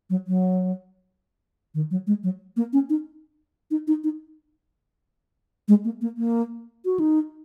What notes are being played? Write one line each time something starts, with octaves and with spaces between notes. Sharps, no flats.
F#3
F#3
D#3
F#3
G#3
F#3
A#3
C#4
D#4
D#4
D#4
D#4
G#3
A#3
A#3
A#3
F#4
D#4